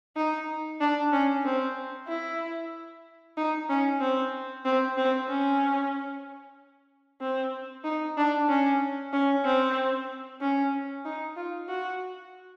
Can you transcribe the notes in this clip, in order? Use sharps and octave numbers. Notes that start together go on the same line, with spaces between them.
D#4
D4
C#4
C4
E4
D#4
C#4
C4
C4
C4
C#4
C4
D#4
D4
C#4
C#4
C4
C#4
D#4
F4
F#4